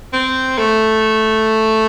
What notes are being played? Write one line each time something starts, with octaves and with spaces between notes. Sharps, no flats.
C4
A3